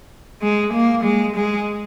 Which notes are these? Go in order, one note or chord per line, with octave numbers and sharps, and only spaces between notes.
G#3
A#3
G#3
G#3